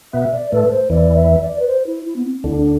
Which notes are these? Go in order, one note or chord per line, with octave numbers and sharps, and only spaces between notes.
B2 B3 E5
D5
A2 A3 B4
B4
C5
E2 E3 D5
E5
D5
B4
C5
E4
E4
B3
C4
D2 D3 E4
D4